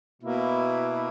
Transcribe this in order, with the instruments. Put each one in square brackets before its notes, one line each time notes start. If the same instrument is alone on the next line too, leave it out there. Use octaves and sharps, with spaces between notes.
[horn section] B2 A#3 E4